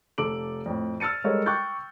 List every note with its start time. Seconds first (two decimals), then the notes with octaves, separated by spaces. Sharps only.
0.18 F1 A4 D6 D7 F#7
0.66 F2 A2
1.00 E6 F6 A6 C#7 D#7
1.24 G3 G#3 A4 A#4 C#5
1.46 G5 C#6 D6 F#6 G6 A6